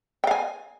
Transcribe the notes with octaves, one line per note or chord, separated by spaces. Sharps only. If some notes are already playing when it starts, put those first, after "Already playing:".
F5 G5 G#5